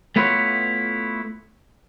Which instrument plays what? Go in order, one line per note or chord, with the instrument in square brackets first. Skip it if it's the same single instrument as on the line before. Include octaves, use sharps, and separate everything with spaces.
[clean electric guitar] A3 B3 E4 F4 B4 C#5